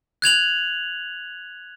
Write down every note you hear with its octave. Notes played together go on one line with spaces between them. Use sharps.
F#6 G#6 F7 F#7